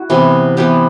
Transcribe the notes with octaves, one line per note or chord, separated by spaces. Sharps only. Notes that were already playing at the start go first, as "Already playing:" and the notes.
Already playing: E4 F#4
C3 E3 B3
C3 E3 B3 G4